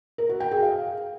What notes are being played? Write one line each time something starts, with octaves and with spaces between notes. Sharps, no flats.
A#4
F#4
G5
G#4
F5